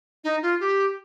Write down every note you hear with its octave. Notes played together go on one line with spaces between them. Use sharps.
D#4
F4
G4